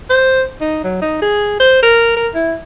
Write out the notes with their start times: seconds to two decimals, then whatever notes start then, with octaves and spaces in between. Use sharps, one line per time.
0.09 C5
0.61 D#4
0.83 F#3
1.01 D#4
1.22 G#4
1.60 C5
1.82 A#4
2.16 A#4
2.34 E4